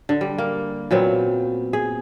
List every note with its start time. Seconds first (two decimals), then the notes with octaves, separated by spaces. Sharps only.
0.09 D3
0.21 G3
0.38 A#3
0.91 A#2 F#3 B3 C4
1.73 G#4